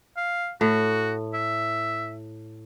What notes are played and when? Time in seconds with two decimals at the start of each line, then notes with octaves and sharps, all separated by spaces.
0.17 F5
0.61 A2 F#4
1.34 E5